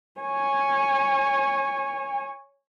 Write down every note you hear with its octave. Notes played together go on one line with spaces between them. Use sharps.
C#5 G#5